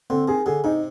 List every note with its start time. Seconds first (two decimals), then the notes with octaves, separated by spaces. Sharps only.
0.10 D3 C4
0.28 D#3 G#4
0.46 D3 G#4
0.64 C3 D#4